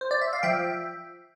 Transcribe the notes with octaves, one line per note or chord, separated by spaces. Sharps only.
C5
D5
E5
F5
F3 E5 G5